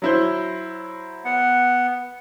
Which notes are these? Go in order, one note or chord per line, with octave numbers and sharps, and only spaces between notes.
F#3 E4 C5
B3 F#5